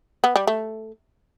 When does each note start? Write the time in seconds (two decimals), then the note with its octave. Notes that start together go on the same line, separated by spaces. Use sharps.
0.24 B3
0.36 G3
0.47 A3